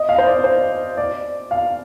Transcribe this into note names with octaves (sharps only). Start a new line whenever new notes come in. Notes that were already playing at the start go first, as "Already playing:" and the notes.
Already playing: D#5
F5
C5
D5
C5
D5
F5